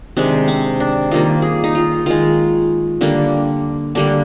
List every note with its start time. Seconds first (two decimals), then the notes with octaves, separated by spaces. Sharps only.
0.17 C3 D#3 G#3 D4
0.48 C4
0.80 D4
1.11 D#3 G3 A#3 F4
1.42 G#4
1.64 D#4
1.75 F4
2.06 D#3 G#3 F4
3.01 D3 G3 A#3 D4
3.95 D3 G3 A#3 D4